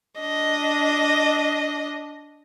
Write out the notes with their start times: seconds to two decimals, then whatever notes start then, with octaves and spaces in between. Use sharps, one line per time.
0.20 D4 D#5